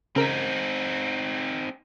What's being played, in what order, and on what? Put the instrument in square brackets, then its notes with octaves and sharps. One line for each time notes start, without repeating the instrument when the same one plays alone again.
[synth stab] C#3 A#4 B6 [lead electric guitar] C4 D#4